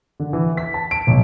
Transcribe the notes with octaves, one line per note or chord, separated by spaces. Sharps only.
D3
E3
B6
A5
D7
B1